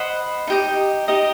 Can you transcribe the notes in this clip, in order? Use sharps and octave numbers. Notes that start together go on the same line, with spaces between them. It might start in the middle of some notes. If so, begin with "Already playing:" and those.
Already playing: C5 D#5 F#5 B5
D#4 G4 D#5
D#4 G4 D#5